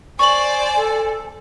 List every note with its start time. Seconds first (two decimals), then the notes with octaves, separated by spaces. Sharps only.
0.19 C5 D5 G#5 C#6 F#7
0.77 A4